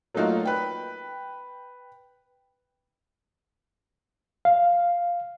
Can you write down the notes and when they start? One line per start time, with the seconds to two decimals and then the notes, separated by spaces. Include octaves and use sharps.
0.14 F#3 A3 A#3 D#4 F4 F#4
0.45 B4 G5
4.45 F5